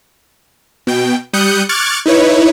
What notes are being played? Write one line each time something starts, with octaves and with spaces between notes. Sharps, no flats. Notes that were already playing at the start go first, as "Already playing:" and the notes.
B2 G5
G3 D#6 F#6 G6 C#7
C#6 D6 F6 F#6 G#6 A6
D#4 E4 B4 C#5